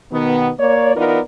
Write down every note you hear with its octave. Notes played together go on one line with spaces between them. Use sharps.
B2 D#3 B3
A#3 C#5 D5
E3 B3 D#4 F4 A#4 D5